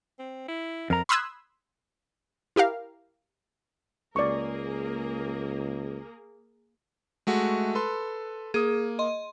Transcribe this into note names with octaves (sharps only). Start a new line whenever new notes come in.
C4
E4
F2 A#4 A#5
B5 C6 D#6 E6 F#6 G#6
E4 G4 A#4 F5
C#2 A#3 G#4 A#4 D5 C#6
G#3 A3 F#4
A4 B4 C6
A#3 G#4 D#6
D#5 C6